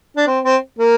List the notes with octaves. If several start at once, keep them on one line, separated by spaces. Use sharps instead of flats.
D4
C4
C4
A#3